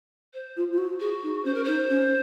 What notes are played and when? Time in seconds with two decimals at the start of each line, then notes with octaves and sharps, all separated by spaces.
0.34 C5
0.57 F4
0.72 F4
0.78 F#4
1.00 F#4 G#4
1.23 D#4
1.45 C#4 C5
1.54 A#4
1.64 D#4 C5
1.90 C#4